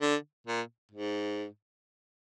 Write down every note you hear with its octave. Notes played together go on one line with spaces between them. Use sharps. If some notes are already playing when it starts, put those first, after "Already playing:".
D3
A#2
G#2